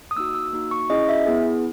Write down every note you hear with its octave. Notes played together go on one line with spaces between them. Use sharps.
D#6
A#3 D#4 F#4 E6
E6
A#3 D#4 F#4
C#6
C#4 E4 G#4 D#5
E5
B3 E4 G#4